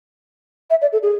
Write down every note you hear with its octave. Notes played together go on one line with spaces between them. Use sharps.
E5
D5
A4
G#4